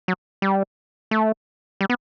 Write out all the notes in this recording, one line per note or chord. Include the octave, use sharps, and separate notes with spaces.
F#3
G3
A3
G3
B3